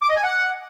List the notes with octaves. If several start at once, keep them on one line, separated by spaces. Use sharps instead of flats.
D6
D#5
G#5
F#5